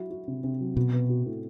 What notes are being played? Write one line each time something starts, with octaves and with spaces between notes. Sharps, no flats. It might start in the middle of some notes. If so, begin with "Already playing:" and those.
Already playing: F#3 E4 F#4
F#4
C3
C3
F#3
B2 F#4
B3
F#4
A2